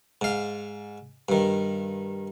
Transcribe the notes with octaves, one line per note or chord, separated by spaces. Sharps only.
G#2 F5
G2 D#3